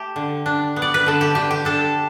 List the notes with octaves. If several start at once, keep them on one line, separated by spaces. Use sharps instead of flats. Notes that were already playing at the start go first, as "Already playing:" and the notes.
Already playing: A3 G4 A4
D3
D4
B3
D5
B4
D3 A4
G4
D3 G4
G4
D4 A4